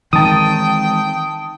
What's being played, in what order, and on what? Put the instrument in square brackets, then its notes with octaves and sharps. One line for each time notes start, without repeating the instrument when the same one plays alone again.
[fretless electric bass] D#3 [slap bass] E3 G#3 C4 [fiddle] G5 [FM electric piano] A5 D#6